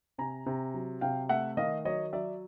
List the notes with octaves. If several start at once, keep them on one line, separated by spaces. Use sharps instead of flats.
C3 G#5 A#5
C3
F#3
C3 F5 G5
A3 E5 F#5
D#3 D#5 F5
F#3 C#5 D#5
F#3 D5 E5